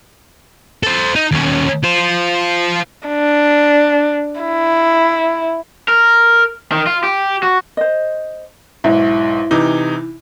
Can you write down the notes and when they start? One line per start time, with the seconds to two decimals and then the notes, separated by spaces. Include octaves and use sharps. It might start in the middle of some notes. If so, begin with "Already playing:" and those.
0.83 A4 C5
1.15 D#4
1.31 D#2 C#4
1.84 F4 C5
3.08 D4
4.40 E4
5.88 A#4
6.72 D#3
6.87 F4
7.04 G4
7.43 F#4
7.77 C5 D#5
8.84 B1 G#2 E4 E5
9.51 C3 E3 D#4